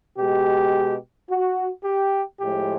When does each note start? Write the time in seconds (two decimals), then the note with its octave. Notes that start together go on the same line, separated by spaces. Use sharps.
0.18 B2 G#3 G4
1.29 F#4
1.84 G4
2.40 A2 F3 G#3 G4